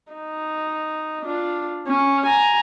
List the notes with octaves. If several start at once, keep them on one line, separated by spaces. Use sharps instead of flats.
D#4
D4 F4
C#4
G#5 A#5